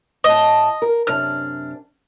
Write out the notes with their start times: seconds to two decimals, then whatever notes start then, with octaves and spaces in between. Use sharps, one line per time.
0.24 A2 D#5 A5
0.82 A#4
1.07 F#2 C3 D4 F6